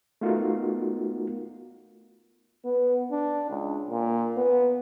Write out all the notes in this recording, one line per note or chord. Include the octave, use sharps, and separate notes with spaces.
A3 B3 D#4 F4 F#4 A#4
B3
D4
C#2
A#2
B3